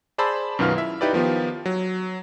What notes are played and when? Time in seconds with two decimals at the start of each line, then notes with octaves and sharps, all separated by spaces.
0.18 G#4 C5 D5 A5 B5 E6
0.59 F#2 B2 D#3 B3 F4 F6
0.75 E4 E5
1.01 D#4 E4 G4 B4 D5
1.13 D#3 F3 B3 F4 G4
1.66 F#3